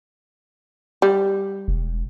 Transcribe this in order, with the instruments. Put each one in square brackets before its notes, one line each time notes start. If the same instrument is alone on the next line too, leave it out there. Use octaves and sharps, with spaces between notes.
[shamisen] G3
[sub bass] E1